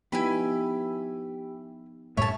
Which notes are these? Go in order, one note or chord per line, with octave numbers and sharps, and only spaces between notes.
F3 B3 D#4 E4 G4 G#5 B5
F#2 A2 G#3 C#5 E5 A5